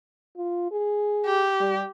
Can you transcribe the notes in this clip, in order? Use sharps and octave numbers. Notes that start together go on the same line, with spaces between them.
F4
G#4
G4
G3